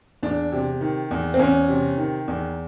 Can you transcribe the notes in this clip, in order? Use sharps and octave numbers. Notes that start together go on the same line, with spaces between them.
E2 D4
C3
D#3
E2
C4
E2 C#4
C3
D#3
E2